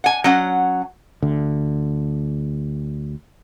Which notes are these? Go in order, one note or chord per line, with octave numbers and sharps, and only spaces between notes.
F#5 G#5
F#3 C#4 F#5
D2 D3